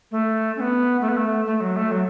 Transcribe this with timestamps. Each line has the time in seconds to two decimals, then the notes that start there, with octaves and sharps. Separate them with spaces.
0.11 A3
0.56 C#4
0.60 B3
1.01 A3
1.08 B3
1.16 A3
1.46 A3
1.60 F#3
1.76 A3
1.91 F#3